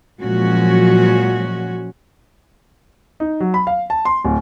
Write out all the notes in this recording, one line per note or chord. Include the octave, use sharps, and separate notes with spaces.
A#2 F3 F#3 G#3 C#4 F#4
D#4
F#3
B5
F5
A5
C6
D1